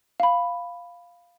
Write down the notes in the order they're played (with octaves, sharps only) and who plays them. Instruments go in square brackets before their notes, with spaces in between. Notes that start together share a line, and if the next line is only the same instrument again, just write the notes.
[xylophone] F5 B5